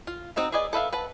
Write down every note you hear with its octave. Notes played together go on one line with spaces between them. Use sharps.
F4
C4 D#4 F#4 A#5
G#4 B4 D5 D#5 G#5
A4 B4 E5 F5
B4 F#5 A5